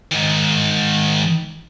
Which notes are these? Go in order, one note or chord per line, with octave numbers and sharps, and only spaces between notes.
G#2 D#3